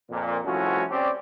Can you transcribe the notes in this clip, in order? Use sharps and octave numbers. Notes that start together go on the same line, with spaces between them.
F2 A#2
C2 F3 A3 C#4 E4 F#4
C4 C#4 G4 D5